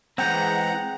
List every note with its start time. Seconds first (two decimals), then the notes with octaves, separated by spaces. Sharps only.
0.18 E3 G#3 C4 F#5 G5 A#5